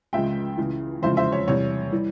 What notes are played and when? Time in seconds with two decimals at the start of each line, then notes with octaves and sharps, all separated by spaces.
0.13 C#2 C#3 F3 G#3 E5 G5
0.57 C#2 C#3 E3
1.02 F1 E2 C#3 F3 G#3 C5 E5
1.17 C5 E5
1.32 C#5
1.47 E2 C3 G3 C#5
1.92 E3 G3